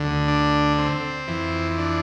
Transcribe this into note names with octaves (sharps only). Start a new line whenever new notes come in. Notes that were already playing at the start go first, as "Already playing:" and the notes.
Already playing: D2 D3
D4
C4
F2 E3
D4